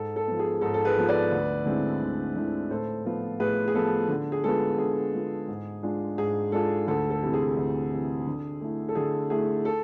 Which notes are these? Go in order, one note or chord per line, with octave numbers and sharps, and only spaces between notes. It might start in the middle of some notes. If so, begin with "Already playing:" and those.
Already playing: G#2 A4
A4
F3 B3
G#4
G#2 A4
A4
G#4 B4
F3 B3
B4 D5
D2
D3 G#3 C4 E4
D2
D3 G#3 C4 E4
A2 A4 C5
F3 B3 F4
A2 G#4 B4
G#4
F3 B3 F4 A4
D3
G#4
G#3 B3 F4 A4
D3 G#4
G#3 B3 F4
G#2
G#3 D4 F4
G#2 G#4
G#3 D4 F4 A4
D2 A4
A4
C3 E3
G#4
D2
C3 E3
D3
A3 E4
A4
D3 G#4
A3 E4 G#4
A4